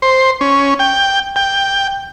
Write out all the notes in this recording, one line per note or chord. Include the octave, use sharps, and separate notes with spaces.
C5
C#4
G5
G5